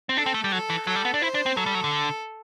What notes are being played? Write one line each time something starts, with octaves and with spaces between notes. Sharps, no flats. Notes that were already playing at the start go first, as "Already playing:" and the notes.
C4
D4 A4
C4
A3
G3
F#3 A4
E3
F#3 A4
G3
B3
D4
E4 C5
D4
C4
F#3 A4
G3
F#3
D3